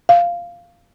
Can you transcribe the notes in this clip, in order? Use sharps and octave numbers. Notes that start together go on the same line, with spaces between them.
F5